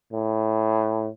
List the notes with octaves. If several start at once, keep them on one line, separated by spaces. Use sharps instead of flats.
A2